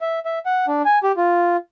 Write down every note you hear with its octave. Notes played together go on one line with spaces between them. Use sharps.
E5
E5
F#5
D4
G#5
G4
F4